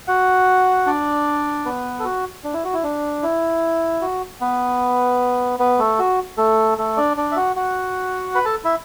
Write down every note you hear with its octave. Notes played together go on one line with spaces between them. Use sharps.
F#4 F#5
D4 D5
B3 B4
A4
F#4
D4
E4
F#4
E4
D4
E4
F#4
B3 B4
B3 B4
A3 A4
F#4
A3 A4
A3 A4
D4 D5
D4 D5
E5
F#4 F#5
F#4 F#5
B4 B5
A4 A5
E4 E5